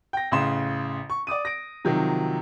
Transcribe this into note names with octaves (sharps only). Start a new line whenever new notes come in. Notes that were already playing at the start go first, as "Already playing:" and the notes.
G5 A#6
A1 C#3 C6 E7
C#6
D5 D6 D#6 D#7
A#6 D7
C3 D#3 F3 F#3